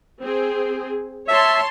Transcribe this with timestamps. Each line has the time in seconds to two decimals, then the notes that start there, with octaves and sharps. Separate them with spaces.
0.20 C4 G#4
1.28 C#5 E5 A5 C6